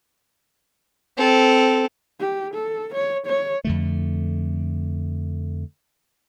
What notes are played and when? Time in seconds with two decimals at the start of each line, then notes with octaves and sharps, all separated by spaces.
1.18 C4 A4
2.20 G4
2.54 A4
2.94 C#5
3.27 C#5
3.65 F2 D3 A3